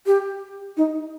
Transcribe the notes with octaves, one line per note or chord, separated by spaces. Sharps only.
G4
D#4